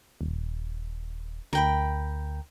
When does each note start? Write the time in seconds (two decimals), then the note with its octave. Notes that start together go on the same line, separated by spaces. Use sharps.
0.21 D#1
1.53 D2 A#4 G5 B5